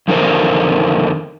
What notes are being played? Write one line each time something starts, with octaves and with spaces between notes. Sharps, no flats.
F2 D3 D#3 A#4 C5